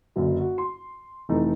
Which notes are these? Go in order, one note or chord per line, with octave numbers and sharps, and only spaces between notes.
F#1 F#2 D3 F#3
F#4
C6
F1 E3 A3 D#4